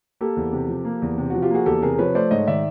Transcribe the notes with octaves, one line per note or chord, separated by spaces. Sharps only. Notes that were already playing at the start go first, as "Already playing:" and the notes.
A#3 G4 A4
E2
C3
F3
A#3
E2
C3
F3 F#4
F4 G4
A#3 F#4 G#4
E2 G4 A4
C3 G#4 A#4
F3 B4 C#5
A3 C5 D5
G#2 C#5 D#5
D#3 D5 E5